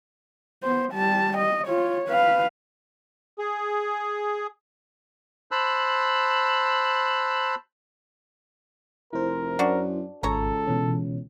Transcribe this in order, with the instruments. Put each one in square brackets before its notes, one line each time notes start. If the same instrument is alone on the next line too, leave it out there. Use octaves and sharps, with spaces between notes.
[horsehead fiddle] B3 C5
G3 A5
D#5
F4 C#5
B4 F5
[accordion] G#4
[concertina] C5 A5 B5 E6 F#6
[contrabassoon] F1 [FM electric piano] E4 C5 [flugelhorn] A#4
[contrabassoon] F#2 [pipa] D4 F#4
[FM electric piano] G#1 [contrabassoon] C#2 [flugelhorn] A4 [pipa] C#5 A#5
[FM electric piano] B2 E3 C#4